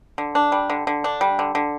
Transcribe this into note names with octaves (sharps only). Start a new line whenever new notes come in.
D3
D4
G3
D3
D3
D4
G3
D3
D3